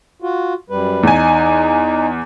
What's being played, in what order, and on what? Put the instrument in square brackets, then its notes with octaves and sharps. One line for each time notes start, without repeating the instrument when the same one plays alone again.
[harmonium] F4 F#4
F#2 G3 B4
[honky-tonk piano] E2 G#5 [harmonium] D#4